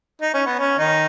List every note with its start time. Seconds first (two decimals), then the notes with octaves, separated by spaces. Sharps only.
0.22 D#4
0.34 C#4
0.46 B3
0.59 C#4
0.78 D#3 D#4